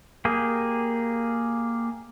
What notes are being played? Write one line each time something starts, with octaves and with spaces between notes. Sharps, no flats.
A#3 G4 G#4